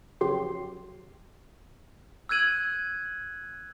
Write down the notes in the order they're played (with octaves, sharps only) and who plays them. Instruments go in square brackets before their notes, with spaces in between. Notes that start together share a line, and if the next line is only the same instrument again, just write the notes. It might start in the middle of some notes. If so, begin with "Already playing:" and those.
[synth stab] F2 C#3 F#3 G4 C6
[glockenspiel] E6 F#6 G#6 D#7 F#7